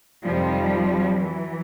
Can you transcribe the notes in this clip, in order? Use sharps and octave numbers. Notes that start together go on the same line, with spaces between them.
F2 C3 D#3 F3 G3
E3 F#3